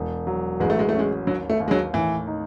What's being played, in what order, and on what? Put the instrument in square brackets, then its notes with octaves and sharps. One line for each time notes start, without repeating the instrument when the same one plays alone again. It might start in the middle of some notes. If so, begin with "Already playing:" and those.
Already playing: [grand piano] E1
F#3
[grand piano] A1 [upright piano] G#3
[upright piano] A3
G#3
A3
[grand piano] C#4
[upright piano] G#3
[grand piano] D#2 [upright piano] F#3
[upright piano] A3
[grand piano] D#2
[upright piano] G#3
F#3
[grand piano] A2 [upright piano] E3
[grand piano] D#4